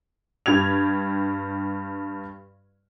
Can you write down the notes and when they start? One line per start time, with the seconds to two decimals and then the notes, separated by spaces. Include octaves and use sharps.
0.46 G2 G4 G#6 F7